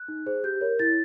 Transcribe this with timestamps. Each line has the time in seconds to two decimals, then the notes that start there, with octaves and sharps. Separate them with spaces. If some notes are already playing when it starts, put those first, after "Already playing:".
Already playing: F#6
0.08 D#4
0.26 G#4 C5
0.44 G4 G6
0.61 A#4 C#5
0.79 E4 A6